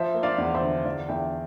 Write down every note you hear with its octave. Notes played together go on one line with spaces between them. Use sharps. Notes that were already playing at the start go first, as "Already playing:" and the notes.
Already playing: F3 C5 E5
A#3
D5 F5
E2
F5
C5 E5
D3
E2 D5 F5
E2 E5 G5